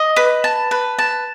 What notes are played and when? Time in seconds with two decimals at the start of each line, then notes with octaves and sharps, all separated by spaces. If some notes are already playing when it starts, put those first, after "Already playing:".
Already playing: D#5
0.17 B4
0.44 A5
0.71 B4
0.99 A5